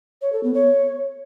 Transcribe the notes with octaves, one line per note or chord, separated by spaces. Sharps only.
C#5
A4
B3
C#5